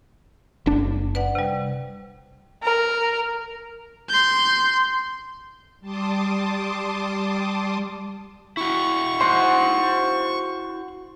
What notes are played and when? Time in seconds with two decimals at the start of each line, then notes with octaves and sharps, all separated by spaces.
0.66 F#1 D4
1.15 B4 D5 F#5
1.35 C3 G3
2.63 A#4
4.09 C6 G6
5.81 G3 A5 C6 D6 D#6
8.57 E4 F#4 C#6
9.21 C5 F#5 C6